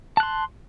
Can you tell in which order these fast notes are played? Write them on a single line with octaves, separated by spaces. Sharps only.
A5 F#6 C6